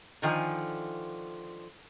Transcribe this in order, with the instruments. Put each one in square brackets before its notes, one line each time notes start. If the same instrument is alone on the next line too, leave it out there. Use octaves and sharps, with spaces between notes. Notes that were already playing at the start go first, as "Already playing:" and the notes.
[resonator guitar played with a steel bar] D3 D#3 F3 F#5 G#5